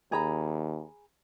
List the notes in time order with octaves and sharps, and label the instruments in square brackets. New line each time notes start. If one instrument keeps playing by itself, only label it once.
[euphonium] D#2 [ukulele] G#4 A#5 B5